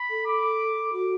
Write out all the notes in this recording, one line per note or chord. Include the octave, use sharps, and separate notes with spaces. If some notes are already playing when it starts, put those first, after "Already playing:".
Already playing: B5
A4
D6
F#4